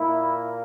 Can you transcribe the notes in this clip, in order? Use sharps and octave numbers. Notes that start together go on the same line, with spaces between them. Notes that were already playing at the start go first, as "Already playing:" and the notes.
Already playing: A#2 A#3 E4